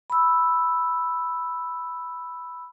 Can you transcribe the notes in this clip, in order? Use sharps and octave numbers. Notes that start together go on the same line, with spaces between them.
B5 E6